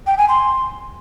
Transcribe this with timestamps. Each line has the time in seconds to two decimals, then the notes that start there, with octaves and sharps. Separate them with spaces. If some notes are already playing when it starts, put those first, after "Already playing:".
0.07 G5
0.18 G#5
0.29 C6